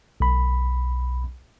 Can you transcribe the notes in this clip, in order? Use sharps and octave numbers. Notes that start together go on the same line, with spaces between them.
B1 B5